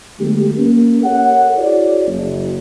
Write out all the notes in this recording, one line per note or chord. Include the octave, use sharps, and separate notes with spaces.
D3 F#3 G#3 A3 B3 G4
A#3 C#4 A#4
G4 A4 A#4 C#5 F#5
E4 F#4 G#4 C#5 D5
F#1